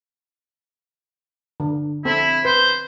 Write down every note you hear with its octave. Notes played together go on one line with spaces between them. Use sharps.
D3
C4 E4 A4
B4 C5